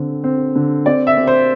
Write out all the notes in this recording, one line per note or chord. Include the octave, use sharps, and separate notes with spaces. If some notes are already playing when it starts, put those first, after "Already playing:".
Already playing: D3 C4
C4
D3
C4 D5
E5
C4
C5